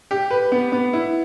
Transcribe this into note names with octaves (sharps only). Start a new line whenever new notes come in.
G4
B4
B3
B3
E4